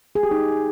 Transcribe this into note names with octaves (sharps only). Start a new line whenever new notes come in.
G#4
G4
D#4